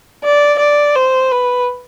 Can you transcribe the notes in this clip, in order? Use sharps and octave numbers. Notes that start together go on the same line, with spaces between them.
D5
D5
C5
B4